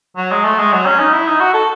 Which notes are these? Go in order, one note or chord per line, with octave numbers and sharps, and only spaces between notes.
F#3
G#3
A3
G#3
F#3
C#4
D#4
E4
D#4
F#4
A4